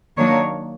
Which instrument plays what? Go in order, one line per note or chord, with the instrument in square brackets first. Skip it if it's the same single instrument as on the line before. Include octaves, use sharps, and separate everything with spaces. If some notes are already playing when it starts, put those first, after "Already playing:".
[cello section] D#3 F#3 A#3 D4 C#5